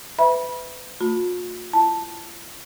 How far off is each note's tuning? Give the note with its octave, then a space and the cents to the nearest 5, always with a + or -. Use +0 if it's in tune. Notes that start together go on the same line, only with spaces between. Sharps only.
B4 +25 E5 +0 B5 -25
A3 +35 F4 +45 B5 +0
E4 +45 A5 +0